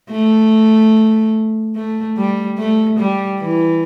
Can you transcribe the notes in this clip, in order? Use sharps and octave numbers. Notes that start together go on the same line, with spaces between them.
A3
A3
G3
A3
G3
E3